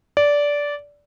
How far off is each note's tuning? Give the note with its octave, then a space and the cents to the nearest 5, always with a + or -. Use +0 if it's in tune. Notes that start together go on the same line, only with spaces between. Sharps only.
D5 -15